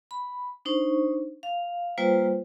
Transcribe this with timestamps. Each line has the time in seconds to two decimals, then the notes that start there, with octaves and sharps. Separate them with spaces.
0.11 B5
0.65 D4 D#4 C5 C#6
1.43 F5
1.98 G3 A#3 F4 B4 C5 G5